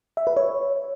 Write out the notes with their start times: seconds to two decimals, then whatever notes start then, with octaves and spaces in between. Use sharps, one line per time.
0.17 E5
0.27 B4
0.37 C#5